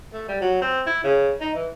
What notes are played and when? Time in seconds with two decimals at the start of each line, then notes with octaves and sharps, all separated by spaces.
0.13 A3
0.29 G3
0.41 F#3
0.62 C4
0.87 E4
1.04 C#3
1.40 D#4
1.54 E3